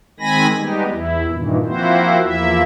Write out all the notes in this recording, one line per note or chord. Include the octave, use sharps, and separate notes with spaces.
D#3 G#3 C4 G#5 B5 A#6
G3 G#3 B3 D#4 G4
E2 E4
G2 A#2 D#3 E3
F3 A#3 C4 E4 F#4 C5
E2 F3 A#3 E4 E5